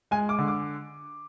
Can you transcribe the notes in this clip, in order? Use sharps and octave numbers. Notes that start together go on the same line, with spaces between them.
G#3 G#5
D6
D3
D6